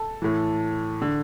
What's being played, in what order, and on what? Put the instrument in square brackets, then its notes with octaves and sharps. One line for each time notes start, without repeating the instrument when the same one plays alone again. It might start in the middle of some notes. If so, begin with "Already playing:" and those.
Already playing: [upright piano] A4
A2 E3
D3